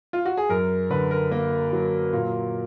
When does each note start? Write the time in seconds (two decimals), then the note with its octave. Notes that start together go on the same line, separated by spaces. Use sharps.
0.13 F4
0.25 F#4
0.37 G#4
0.49 F#2 A#4
0.90 D3 B4
1.11 A#4
1.31 A#3
1.73 F#3
2.13 A#2